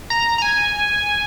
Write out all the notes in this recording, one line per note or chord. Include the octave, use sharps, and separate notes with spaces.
A#5
A#5
G#5